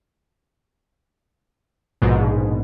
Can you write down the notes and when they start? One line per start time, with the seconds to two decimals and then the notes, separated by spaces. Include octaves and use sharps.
2.02 A#1 G#2 B2